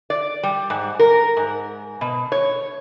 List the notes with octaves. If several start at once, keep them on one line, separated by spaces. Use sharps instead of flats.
D5
G3
G#2
A#4
G#2
B2
C#5